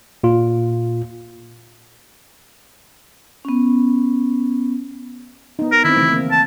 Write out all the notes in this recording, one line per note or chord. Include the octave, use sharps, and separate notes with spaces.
A#2 F4
B3 C#4
B3 D#4
A#4
D#3 C4 E4
C#3 E3 A3
A#3 C4
A5